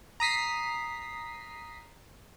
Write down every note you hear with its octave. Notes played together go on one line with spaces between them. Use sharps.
A#5 D#6 B6 C7